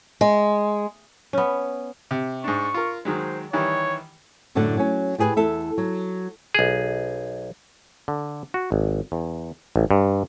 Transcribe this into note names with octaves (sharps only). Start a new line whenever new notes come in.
G#3
B3 C#4
C3
G#2 D4 C#6
F4 A#4
D#3 F#3 G#3 C5
D#3 E3 G3 C#5
F#2 A2 D3 F#4 F#5
F#3 C#4
A2 G4 G#4 B4
E2 A4 E5
F#3
B1 G#4
D3
F#4
G#1
E2
A1
G2